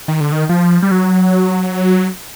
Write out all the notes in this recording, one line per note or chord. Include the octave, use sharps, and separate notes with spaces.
D#3
D3
D#3
F3
G3
F#3